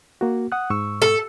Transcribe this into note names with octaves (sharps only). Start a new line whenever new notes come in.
A#3 F#4
F#5 D#6 F#6
G#2 C#6 E6
A4